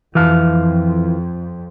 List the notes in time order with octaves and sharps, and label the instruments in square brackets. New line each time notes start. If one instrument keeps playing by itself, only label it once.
[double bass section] F2 [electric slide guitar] E3 F5